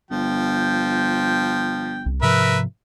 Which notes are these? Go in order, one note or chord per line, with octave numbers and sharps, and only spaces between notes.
G1 F3 G5
C2
G#2 C3 F3 A#4 B4 E5